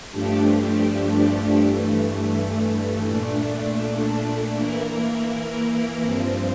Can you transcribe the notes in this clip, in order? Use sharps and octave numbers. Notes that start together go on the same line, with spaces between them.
G2 F3 A3 D4 G4
G2 E3 A3
A#2 A3 D4
E3 A#3 E4 A#4
G2 F3 C4